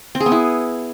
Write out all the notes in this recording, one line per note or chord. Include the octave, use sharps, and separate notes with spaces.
C4
G#4
B3
E4